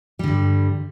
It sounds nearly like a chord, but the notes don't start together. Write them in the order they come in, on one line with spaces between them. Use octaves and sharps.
G3 D3 G2